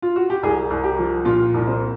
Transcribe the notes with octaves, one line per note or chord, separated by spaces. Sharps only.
F4
F#4
G4
C2 G#4
C2
G4
F3
A#2 F4
C2
C4